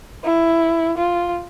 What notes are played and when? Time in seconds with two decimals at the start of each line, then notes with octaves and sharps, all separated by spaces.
0.24 E4
0.98 F4